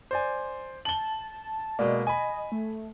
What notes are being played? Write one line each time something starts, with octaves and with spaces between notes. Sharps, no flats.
C5 D5 G#5
A5 F#7 G7
B2 G#3 A#3 D5
D#5 G#5 B5
A3